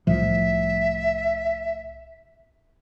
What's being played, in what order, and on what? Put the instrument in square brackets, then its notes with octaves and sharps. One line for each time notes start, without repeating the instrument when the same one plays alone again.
[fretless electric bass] C2 A2 F3 [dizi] E5